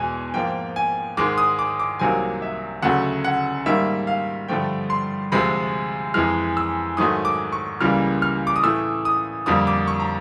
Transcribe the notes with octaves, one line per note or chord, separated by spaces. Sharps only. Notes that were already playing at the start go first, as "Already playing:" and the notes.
Already playing: E2 B2 G#3 G#5
G#2 F3 A#3 G5
G#5
G#2 D#3 G#3 D6
D#6
D6
D6
C2 C3 D#3 F#3 A#3 G#5
E5
D2 C#3 F#3 A3 F#5
F#5
G#2 D#3 G3 A#3 E5
F5
G2 D3 F3 A3 G5
C6
D2 C3 F3 G#3 B5
F2 C3 E3 G#3 F6
E6
G#2 D#3 F#3 A3 D#6
D6
C#6
C#2 C#3 E3 G3 A#3 F6
F6
D6
D#6
A2 E3 A3 E6
D#6
F2 D3 G3 A#3 D#6
D6
C#6
A#5